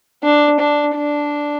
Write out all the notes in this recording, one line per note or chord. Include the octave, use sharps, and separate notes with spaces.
D4
D4
D4